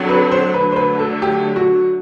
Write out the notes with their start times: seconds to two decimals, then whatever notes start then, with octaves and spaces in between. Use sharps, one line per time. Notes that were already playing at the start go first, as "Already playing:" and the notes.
Already playing: D3 F#3 C4
0.09 B4
0.31 C5
0.54 D3 F#3 A3 B4
0.72 C5
0.76 B4
0.99 A4
1.22 G4
1.56 F#4